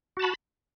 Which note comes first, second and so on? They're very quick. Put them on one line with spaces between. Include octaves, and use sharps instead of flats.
F#4 A5 B5